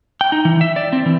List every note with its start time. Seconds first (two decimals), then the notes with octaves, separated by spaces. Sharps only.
0.21 G5
0.32 D#4
0.45 E3
0.61 E5
0.76 D5
0.93 C4
1.06 E3